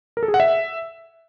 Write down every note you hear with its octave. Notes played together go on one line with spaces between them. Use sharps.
A#4
A4
G#4
F#5
E5